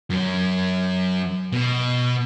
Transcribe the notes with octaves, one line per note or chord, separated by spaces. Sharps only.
F#2 F#3
B2